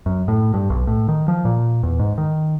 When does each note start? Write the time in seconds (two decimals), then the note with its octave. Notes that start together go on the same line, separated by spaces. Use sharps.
0.06 F#2
0.28 A2
0.54 G2
0.70 B1
0.87 A2
1.09 D#3
1.28 F3
1.45 A#2
1.83 E2
1.99 G#2
2.18 D#3